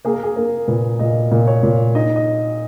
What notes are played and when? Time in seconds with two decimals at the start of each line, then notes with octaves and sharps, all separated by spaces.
0.05 A#3 G#4
0.14 A#4
0.23 G#4
0.36 A#3 A#4
0.67 A#2 B4
0.99 A#2 D#5
1.31 A#2
1.47 C#5
1.63 A#2
1.95 D#4 D#5
2.16 D#5